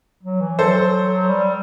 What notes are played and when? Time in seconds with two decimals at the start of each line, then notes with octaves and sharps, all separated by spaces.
0.23 F#3
0.41 E3
0.59 F#3 A4 C5
1.29 G3